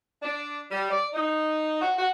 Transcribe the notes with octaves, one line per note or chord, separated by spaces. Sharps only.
D4
G3
D5
D#4
F#4
F#4